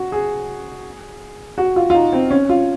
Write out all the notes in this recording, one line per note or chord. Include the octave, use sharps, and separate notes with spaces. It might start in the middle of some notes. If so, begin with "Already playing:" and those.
Already playing: F#4
G#4
F#4
F4
F4
D#4
C4
C#4
F4